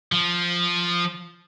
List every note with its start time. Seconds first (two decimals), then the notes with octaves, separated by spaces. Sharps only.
0.12 F3